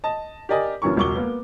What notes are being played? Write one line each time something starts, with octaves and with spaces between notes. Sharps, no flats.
D#5 A5
G4 A#4 D5 D#5 G#5
A#1 F#2 E3 C#4 A#4 C#6
E1 C#2 F#3 C#6 D6 G7
A#3 B3